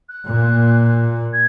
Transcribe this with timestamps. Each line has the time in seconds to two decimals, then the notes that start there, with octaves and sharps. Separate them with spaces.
0.09 F#6
0.27 A#2
1.33 G#6